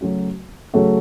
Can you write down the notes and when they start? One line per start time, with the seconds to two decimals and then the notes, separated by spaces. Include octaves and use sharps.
0.01 C#3 F#3 A3 C#4 F#4
0.74 C#3 F#3 A3 C#4 F#4